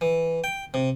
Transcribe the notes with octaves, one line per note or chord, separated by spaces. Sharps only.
E3
G5
C3